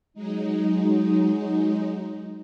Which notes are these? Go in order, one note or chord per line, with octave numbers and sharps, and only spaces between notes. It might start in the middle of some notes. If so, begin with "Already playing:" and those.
F#3 G#3 D#4